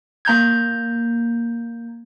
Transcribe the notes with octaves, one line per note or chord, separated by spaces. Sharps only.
A#3 A#5 G6 G#6